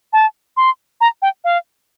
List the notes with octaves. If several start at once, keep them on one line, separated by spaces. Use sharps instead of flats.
A5
C6
A#5
G5
F5